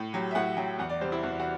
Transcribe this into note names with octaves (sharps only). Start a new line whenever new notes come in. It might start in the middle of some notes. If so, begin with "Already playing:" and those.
Already playing: A2
F#3 G4
E5
A2 F#5
F#3 G5
E2 F#5
D5
C3 G3 C5
E4
E2 F#4
F#4